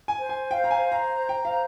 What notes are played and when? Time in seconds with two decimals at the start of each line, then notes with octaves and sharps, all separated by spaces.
0.08 G#5
0.19 C5
0.29 G#5
0.51 F5 G5
0.64 A#5
0.71 G#5
0.81 C5
0.92 A#5
1.13 A#5
1.29 G5
1.44 C5 F5